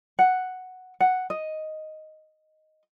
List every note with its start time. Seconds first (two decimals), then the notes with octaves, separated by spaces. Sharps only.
0.19 F#5
1.00 F#5
1.30 D#5